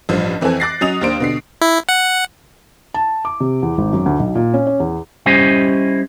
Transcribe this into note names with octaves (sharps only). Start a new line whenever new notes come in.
A1 G2 F3
F2 E3 C4 A4 G#5
D6 F#6 A6 A#6 C7
F#3 C#4 D#5 D#6 F7
D#2 A#3 D4 C5 D7
B2 D3 C7
E4
F#5
A5
D6
C3
E2
G#1
F#2
D2
B1
A#2
C#4
C#4
E2
G3 C#4 E4 G4 C5 D#5